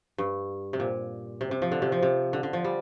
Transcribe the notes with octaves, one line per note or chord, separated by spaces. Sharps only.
G2
C3
A#2
C3
C3
F3
D3
C3
F3
C3
D3
D3
F3
G3